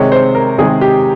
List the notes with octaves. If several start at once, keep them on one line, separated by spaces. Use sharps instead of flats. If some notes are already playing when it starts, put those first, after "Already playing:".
Already playing: C3 D#3 G#3 C#5
C5
A#4
C3 D#3 G#3 G#4
G4